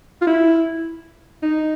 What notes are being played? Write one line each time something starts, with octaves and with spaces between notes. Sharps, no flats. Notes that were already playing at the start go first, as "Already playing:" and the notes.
F4
E4
D#4